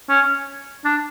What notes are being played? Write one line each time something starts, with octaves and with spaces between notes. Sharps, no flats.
C#4
D4